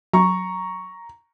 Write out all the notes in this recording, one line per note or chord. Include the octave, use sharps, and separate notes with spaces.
F#3 A#5 C#6